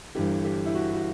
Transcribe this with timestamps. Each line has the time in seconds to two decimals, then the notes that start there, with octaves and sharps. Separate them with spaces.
0.15 G1 G2 E3 G4
0.44 G4
0.66 E4
0.75 F#4
0.93 F#4